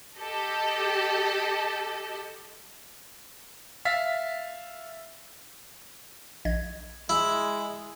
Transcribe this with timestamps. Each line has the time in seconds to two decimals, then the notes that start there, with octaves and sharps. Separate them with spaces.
0.19 G4 A4 D#5
3.85 E5 F5 A6 B6
6.45 A#1 D#5 G#6
7.09 G#3 E4